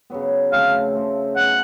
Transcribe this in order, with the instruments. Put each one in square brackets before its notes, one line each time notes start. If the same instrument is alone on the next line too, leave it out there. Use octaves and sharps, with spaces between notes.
[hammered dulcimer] C#3 F#3 B3
[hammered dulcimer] C#3 F3 A3 C4 [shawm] F5
[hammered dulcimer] C#3 F3 A3 C4
[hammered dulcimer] F#3 B3 D#4 [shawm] F#5